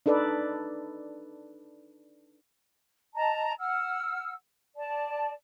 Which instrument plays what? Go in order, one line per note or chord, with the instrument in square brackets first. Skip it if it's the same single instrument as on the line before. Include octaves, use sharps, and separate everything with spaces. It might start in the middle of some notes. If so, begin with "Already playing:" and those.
[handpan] D4 D#4 A4 B4 D5
[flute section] D#5 A5 A#5
F#5 E6 F6
D5 A5